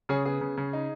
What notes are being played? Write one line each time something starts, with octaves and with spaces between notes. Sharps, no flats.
C#3 G#4 C#5
B3 G#4
C#3
C#3
D#4